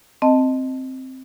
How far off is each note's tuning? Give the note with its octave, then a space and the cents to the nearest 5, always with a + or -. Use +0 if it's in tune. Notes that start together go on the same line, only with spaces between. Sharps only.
C4 +0 D#5 +0 A5 +0